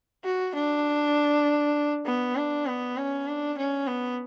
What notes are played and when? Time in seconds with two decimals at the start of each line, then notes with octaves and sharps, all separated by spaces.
0.24 F#4
0.55 D4
2.06 B3
2.36 D4
2.67 B3
2.97 C#4
3.27 D4
3.58 C#4
3.88 B3